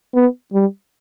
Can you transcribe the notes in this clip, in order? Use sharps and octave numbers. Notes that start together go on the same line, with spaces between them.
B3
G3